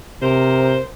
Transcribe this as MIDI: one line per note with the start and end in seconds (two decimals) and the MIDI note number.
0.22 0.80 48
0.22 0.86 70
0.22 0.86 72